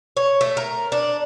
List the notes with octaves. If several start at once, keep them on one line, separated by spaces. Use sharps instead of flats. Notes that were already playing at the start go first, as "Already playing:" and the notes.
C#5
A3
A#4
D4